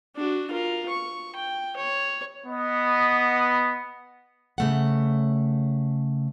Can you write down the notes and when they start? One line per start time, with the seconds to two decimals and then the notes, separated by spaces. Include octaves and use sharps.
0.16 D4 F#4
0.51 F4 A#4
0.89 C#6
1.36 G5
1.76 C#5
2.47 B3 D#5
4.58 C#3 A3 F#5